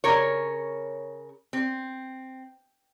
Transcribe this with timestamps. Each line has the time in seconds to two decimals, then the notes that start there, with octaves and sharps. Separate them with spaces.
0.04 C#3 A#4 C#5
1.53 C4